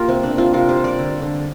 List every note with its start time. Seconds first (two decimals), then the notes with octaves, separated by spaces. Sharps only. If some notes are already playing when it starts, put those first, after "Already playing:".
Already playing: A#3 F4 G4 A#4
0.08 C3 C4
0.23 D4
0.31 A#3
0.38 C4 F4
0.53 C3 F4 A#4
0.69 G4 C5
0.76 G3
0.84 A#4 D5
0.99 D3
1.22 D3